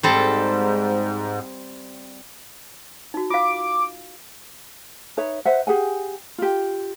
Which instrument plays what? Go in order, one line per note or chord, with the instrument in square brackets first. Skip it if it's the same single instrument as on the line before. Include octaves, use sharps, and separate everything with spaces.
[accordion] G#2 [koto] G3 C4 A4
[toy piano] D#4 F#4
[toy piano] F4 F5 [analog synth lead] D6
[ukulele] D#4 B4 C#5 E5
B4 C5 E5 F#5
G4 G#4 F#5 G#5
F4 G4